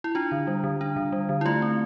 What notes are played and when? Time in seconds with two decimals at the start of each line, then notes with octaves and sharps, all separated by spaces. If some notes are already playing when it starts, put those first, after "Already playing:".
0.04 E4
0.15 D4 F4
0.32 D3
0.47 G3
0.64 D3
0.81 D4
0.96 D3
1.12 G3
1.29 D3
1.41 E4
1.45 A3 F4
1.62 C4